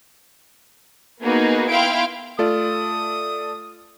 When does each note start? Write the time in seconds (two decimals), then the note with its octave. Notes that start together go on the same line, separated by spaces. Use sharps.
1.22 A#3 B3 D#4 F#4 G#4 B4
1.69 B3 E4 F5 G5 C6 D7
2.39 A3 F4 A4 D5 D#6